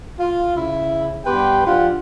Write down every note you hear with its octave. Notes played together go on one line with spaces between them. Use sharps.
F4
C#3 E4
G2 B3 G4 B4 G5 C6
F3 D4 F4 G4 F#5